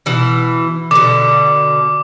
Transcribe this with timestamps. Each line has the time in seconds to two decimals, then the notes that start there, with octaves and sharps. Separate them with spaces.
0.06 B2 E3
0.91 B2 D3 D6